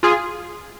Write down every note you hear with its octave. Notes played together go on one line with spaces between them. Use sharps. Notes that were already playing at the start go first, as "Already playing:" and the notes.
F4 G#4